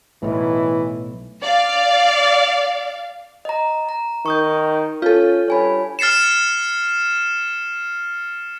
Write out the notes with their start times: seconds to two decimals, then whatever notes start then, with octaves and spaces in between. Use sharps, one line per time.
0.23 B1 A2 E3
1.44 D5 F5
3.45 D#5 A#5
3.89 A#5
4.26 D#3 C#6 D#6 G6
5.02 C#4 F4 A4 G6
5.48 G2 C#5 G#5 B5
5.99 F6 A6 C7 C#7 E7